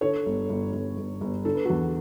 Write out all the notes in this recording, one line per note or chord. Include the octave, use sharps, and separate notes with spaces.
D3 A4 C#5
G1
G1
G1
G1
G1
D3 A4
B4
E2 F#4 A4